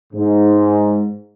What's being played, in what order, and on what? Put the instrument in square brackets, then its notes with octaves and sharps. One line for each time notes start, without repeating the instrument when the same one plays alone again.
[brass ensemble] G#2